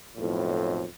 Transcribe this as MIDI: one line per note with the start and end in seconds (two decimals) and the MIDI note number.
0.17 0.84 35
0.17 0.84 41
0.17 0.84 45